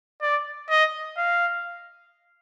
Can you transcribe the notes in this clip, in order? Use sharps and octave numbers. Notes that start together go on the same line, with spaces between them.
D5
D#5
F5